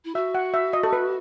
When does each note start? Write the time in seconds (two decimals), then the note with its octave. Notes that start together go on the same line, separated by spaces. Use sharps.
0.04 E4
0.15 F#4 E5
0.35 F#5
0.54 E5
0.73 D#5
0.83 A4
0.93 B4